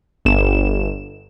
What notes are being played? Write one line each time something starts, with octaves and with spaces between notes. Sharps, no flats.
G1 E7